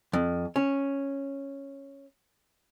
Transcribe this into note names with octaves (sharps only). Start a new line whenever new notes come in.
F2
C#4